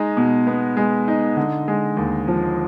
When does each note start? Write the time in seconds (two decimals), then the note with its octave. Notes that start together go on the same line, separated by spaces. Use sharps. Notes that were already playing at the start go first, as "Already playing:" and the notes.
Already playing: G#3 D#4
0.17 B2
0.47 B3
0.77 G#3
1.08 D#4
1.37 D3
1.68 G#3
1.97 D#2
2.28 F3